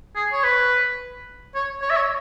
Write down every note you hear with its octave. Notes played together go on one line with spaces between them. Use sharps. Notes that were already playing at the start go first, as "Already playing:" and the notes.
G#4
C#5
B4
C#5
C#5
E5
C#5